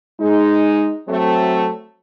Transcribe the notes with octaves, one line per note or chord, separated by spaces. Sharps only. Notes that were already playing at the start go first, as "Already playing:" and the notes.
G#3 D#4
F#3 A3 C4